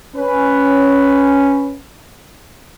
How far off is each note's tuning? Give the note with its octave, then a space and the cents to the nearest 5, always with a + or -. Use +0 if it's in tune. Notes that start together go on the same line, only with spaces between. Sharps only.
C#4 +0 B4 +0